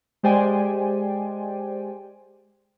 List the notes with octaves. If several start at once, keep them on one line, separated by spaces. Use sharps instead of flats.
G#3 G4 C5 D5 G5 G#5